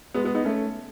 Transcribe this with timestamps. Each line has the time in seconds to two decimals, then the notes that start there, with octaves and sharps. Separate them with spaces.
0.14 G#3 B3
0.24 G#3 B3
0.35 B3 D#4
0.44 A3 C#4